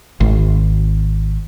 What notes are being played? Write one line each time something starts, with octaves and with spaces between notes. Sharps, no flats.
G#1